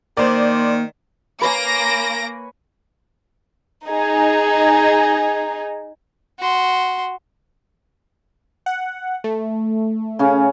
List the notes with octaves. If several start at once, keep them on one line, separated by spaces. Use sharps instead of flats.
D#3 A#3 C5 D5
A#3 B4 C#5 G#5 A#6 D7
D#4 G#4
F#4 C6
F#5
A3
C#3 C#4